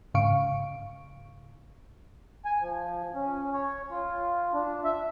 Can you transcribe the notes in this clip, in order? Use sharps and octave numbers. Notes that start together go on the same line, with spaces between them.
G#2 C#3 F5 C#6 D7
G#5
F3
C#4
C#5
F4
D4
E5